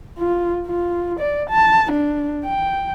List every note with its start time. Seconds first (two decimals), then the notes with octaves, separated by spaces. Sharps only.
0.18 F4
0.68 F4
1.20 D5
1.50 A5
1.92 D4
2.45 G5